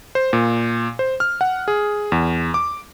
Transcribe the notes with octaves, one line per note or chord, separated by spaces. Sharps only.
C5
A#2
C5
F6
F#5
G#4
E2
D6